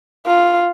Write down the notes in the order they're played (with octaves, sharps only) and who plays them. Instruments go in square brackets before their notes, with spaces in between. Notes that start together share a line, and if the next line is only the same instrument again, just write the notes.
[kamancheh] F4